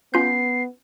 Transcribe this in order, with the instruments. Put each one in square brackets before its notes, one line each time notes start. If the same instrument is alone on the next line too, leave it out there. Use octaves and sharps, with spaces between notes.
[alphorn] B3 [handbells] C#4 F4 G6 [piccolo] C7